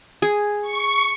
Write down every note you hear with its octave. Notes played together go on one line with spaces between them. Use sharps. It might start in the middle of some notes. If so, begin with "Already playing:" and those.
G#4
C#6